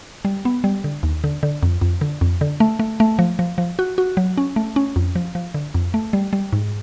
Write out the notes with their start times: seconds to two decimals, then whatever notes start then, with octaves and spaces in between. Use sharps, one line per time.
0.25 G3
0.45 B3
0.64 G3
0.84 D3
1.03 D#2
1.24 D3
1.43 D3
1.63 F2
1.81 F2
2.01 D3
2.21 F2
2.41 D3
2.60 A3
2.79 A3
3.00 A3
3.19 F3
3.39 F3
3.58 F3
3.79 F#4
3.98 F#4
4.17 F#3
4.38 C#4
4.56 A3
4.76 C#4
4.96 F2
5.16 F3
5.35 F3
5.54 D3
5.75 F2
5.94 A3
6.13 G3
6.33 G3
6.53 G#2